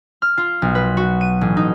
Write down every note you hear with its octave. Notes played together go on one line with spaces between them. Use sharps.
F6
F4
B1
B4
F#4
D#7
A1
D#4